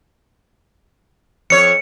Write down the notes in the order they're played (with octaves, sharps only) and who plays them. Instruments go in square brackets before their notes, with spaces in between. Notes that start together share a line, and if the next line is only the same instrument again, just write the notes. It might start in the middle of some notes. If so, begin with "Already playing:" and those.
[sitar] F2 C#5 [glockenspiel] C#7